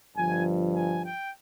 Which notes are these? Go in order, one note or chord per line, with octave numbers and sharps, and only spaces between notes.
G1 G2 F3 G#5
G#5
G5